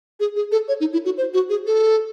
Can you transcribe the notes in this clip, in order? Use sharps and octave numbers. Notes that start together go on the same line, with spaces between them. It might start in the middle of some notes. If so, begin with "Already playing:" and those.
G#4
G#4
A4
C#5
D#4
E4
F#4
C5
F#4
G#4
A4